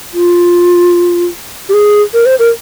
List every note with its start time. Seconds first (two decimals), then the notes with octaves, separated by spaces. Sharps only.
0.14 F4
1.69 G4
1.74 G#4
2.14 A#4
2.26 C5
2.39 A#4